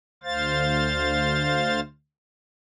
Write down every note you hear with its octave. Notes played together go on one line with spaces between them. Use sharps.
D2 C5 F5 A6